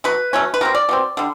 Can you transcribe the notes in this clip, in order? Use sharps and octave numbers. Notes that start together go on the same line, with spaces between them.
B2 F#3 B4
B2 F#3 A3 C#4
B4
B2 G3 C4 A#4
D5
B2 G3 C4
D3 G3